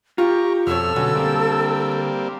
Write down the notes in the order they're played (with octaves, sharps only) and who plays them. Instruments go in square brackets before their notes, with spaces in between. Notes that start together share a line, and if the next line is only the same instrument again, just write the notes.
[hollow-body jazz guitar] F4 [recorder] G4 [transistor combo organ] A#5 C#6
[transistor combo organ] F2 F6 [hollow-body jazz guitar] B2 C#5 [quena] A4 [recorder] E6
[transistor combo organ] B2 F#3 C#4 [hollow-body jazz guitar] D3
[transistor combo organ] G3 A#3 C4